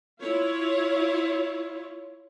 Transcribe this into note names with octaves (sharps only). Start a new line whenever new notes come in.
E4 F4 C#5